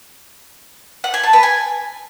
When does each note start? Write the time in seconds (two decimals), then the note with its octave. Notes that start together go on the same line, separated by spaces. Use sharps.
1.04 F#5
1.14 G#5
1.23 A5
1.33 B4
1.43 G#5